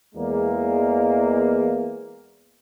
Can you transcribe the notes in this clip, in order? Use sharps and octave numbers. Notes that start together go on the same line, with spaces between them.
E2 G#3 A#3